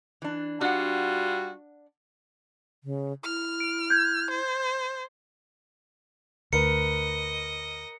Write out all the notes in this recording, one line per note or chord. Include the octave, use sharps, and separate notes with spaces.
E3 D4
G3 D4 F4 F#4 F#5
C#3
E4 F6
D7
G6 G#6
C5
D2 A#4 B4 D#5 C#7